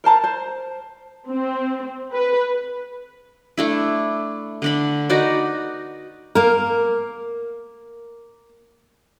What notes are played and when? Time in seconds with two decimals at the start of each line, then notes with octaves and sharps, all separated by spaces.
0.04 A#4 C5 A5 A#5
0.24 C5
1.29 C4
2.13 B4
3.58 A3 D4 E4
4.62 D3 D4 B5
5.10 D#4 F#4 B4 D5
6.35 A#3 A#4